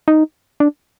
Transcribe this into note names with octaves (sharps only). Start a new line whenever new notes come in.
D#4
D4